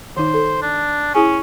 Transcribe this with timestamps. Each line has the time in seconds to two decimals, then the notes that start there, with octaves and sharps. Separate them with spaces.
0.17 D#3 D#4 C5
0.34 A4
0.62 D4
1.14 C#4 E4 G#4 G#5